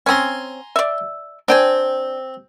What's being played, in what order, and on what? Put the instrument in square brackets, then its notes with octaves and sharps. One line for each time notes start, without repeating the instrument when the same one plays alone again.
[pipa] C4 C#4 [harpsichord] G#5 A#5 C6
[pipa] D5 E5
[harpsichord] C4 [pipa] D4 G5 G#5